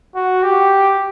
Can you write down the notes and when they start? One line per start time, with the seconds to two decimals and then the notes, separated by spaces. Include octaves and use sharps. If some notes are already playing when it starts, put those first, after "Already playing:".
0.15 F#4
0.43 G4